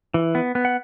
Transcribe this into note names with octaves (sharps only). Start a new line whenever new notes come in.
E3
B3
B3
F#5